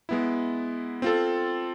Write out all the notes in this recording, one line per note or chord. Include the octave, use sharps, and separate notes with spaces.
G#3 B3 E4
C4 F4 A4